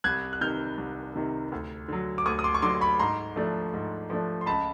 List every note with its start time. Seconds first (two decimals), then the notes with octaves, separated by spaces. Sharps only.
0.04 C2 F#6 G#6
0.33 F#6
0.41 C3 D#3 F6 G6
0.78 C2
1.15 C3 D#3
1.52 D2
1.88 D3 F#3
2.18 D6
2.26 D2 C#6 D#6
2.39 D#6
2.44 C6 D6
2.55 C#6
2.62 D3 F#3 C6 D6
2.81 B5 C#6
2.99 G#2 A#5 C6
3.36 F3 A3 D4
3.74 G#2
4.10 F3 A3 D4
4.41 C6
4.46 C#2 A5 B5